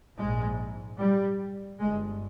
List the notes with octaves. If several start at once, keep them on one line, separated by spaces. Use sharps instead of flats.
A#1 G#2 G#3
G3
G1 G2 G#3